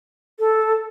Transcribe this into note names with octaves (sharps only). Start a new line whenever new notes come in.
A4